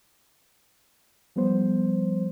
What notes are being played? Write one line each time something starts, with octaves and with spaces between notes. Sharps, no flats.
F3 G3 B3 C5